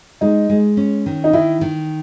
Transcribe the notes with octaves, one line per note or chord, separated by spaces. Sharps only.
G#3 D#4
G#3
C#4
D#3
D#4
D#3 E4
D#3